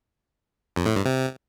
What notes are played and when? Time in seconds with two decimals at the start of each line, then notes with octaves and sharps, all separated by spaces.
0.76 F2
0.86 A2
0.96 G2
1.05 C3